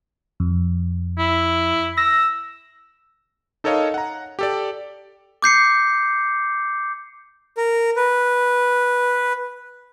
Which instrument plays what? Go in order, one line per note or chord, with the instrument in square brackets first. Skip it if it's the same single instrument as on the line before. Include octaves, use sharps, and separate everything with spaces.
[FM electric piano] F2
[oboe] E4
[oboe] E6 [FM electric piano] A#6
[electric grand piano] D#4 A4 A#4 C#5 D#5 F5
F#5 A#5
G4 A4 D5
[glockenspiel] D6 G6 C7 C#7
[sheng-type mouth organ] A#4
B4